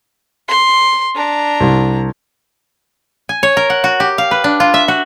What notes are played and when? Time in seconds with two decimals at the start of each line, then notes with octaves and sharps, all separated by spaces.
0.48 C6
1.15 D4 A#5
1.60 C2
3.29 G#5
3.43 C#5
3.57 A#4
3.70 F#5
3.84 F#4
4.00 G4
4.18 F5
4.31 B4
4.44 D4
4.60 F4
4.74 E5
4.88 F#4